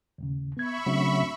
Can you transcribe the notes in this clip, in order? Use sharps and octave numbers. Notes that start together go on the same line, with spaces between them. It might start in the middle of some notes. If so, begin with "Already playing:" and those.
D#2 A2 C#3
B3 E5 B5 C#6 G#6
C#3 F#3 A3 C4 D4